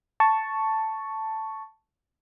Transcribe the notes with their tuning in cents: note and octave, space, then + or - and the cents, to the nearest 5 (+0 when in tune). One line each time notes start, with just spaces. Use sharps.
A5 +0 C#6 +0